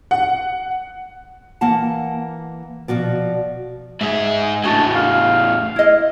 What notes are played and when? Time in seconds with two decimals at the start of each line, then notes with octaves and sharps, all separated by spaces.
0.11 F#5
1.61 E3 A#3 F#5 A5
2.88 B2 F3 F#4 D5
4.01 G#2 G#4 E5
4.64 E2 A2 D4 F#4 G#5
4.95 F5
5.76 E4 D#5